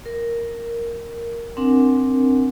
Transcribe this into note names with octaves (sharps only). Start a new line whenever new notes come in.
A#4
C4 D4 A#4 F#5 G#5